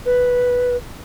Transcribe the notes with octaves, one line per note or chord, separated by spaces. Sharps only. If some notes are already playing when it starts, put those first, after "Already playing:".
B4